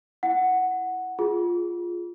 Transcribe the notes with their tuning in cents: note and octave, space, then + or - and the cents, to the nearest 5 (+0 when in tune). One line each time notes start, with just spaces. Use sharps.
E4 +0 F#5 +0
F4 +0 G#4 +0